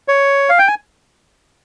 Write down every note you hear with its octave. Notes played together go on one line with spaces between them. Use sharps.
C#5
F5
G5
G#5